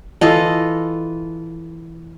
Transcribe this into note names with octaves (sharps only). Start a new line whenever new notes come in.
E3 F4 A4 D#5